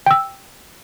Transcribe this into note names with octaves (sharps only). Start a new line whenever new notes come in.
G5 E6